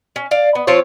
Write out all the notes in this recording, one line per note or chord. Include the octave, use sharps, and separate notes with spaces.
C#4
D5 F5
B3
F3 C4 F4 C#5